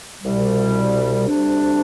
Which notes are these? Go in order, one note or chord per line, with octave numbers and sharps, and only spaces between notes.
C2 B2 G3
D2 C3 G3 D4